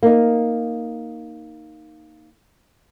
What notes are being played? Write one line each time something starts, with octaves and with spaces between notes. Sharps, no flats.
A#3 D#4